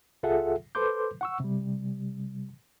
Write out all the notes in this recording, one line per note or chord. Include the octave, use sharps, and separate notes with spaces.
C#2 F4 G#4 A4 E5 F#5
A4 B4 C5 C6 D6 G6
F#5 C#6 E6
C3 G3